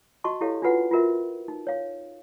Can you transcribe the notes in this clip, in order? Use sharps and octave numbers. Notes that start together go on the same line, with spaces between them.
F#4 D#5 A5 C6 C#6
E4 G4 A4 C#5 F5
D4 F4 F#4 B4 F#5
F4 F#4 A#4 E5
D#4
C#5 F5